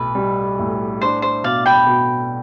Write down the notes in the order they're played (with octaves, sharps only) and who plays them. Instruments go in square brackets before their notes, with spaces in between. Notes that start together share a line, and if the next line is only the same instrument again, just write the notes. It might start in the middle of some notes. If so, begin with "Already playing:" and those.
Already playing: [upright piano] B1 A2 [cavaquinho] B4
[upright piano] G3
A2
[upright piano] D4 [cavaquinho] C5
[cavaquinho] C5
[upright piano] B2 [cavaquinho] D5 F5
[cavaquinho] G5 B5
[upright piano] B2